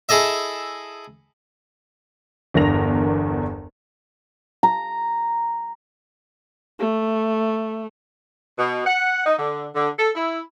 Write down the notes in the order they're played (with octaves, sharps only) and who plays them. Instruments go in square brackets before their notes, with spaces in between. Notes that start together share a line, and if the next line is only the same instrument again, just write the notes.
[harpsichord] E4 G#4 A4 D#5 E5
[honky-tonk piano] G1 E2 D4 A#4 A#6 F7
[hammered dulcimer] A#5
[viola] A3
[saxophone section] B2
F#5
D#4
D3
D3
A4
E4